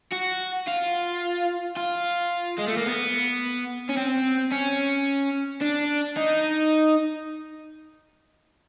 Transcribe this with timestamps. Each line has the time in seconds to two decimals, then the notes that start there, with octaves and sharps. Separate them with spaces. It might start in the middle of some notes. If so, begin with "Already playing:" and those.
0.12 F#4
0.67 F4
1.77 F4
2.59 G#3
2.68 A3
2.77 A#3
2.86 B3
3.89 C#4
3.97 C4
4.52 C#4
5.61 D4
6.17 D#4